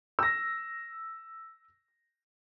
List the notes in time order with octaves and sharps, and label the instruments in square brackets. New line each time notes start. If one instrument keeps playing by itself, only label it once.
[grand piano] E6 A#6